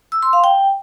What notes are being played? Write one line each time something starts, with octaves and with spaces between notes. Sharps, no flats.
E6
C6
F5
G5